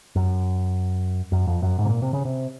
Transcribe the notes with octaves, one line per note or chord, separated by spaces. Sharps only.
F#2
F#2
F2
F#2
G#2
C3
A#2
C3
C#3
C3